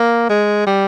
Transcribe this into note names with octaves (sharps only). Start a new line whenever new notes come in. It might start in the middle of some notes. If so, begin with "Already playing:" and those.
Already playing: A#3
G#3
G3